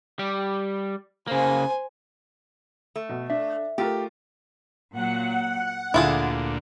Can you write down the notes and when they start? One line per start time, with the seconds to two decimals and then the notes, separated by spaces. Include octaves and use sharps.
0.19 G3 G4
1.27 C#3 A#3 C5 G#5
2.96 A3
3.09 B2
3.30 D4 E5
3.78 A3 F4 G4 A#4
4.92 A#2 F#3 F#5
5.94 D2 A#2 D3 E4 F4 G#4